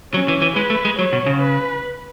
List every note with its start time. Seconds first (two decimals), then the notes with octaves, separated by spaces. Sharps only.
0.14 F#3 C#4
0.28 E3
0.42 E3
0.56 G#3 B4
0.70 A3
0.85 G#3
0.99 F#3 C#5
1.13 B2
1.26 C#3
1.41 B4